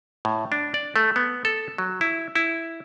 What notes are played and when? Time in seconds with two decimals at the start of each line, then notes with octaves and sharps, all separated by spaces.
0.25 A2
0.52 D4
0.74 D5
0.96 A3
1.16 B3
1.45 A4
1.78 F#3
2.01 E4
2.35 E4